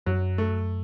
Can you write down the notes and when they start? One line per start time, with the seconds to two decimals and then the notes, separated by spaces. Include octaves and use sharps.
0.06 F#2 F#3
0.38 A3